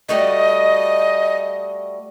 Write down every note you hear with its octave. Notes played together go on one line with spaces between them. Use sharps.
G3 A3 F#4 D#5